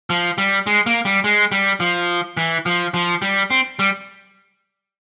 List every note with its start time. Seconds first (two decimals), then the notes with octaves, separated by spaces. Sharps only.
0.10 F3
0.38 G3
0.67 G#3
0.86 A#3
1.05 G3
1.24 G#3
1.52 G3
1.80 F3
2.37 E3
2.66 F3
2.94 F3
3.22 G3
3.50 C4
3.79 G3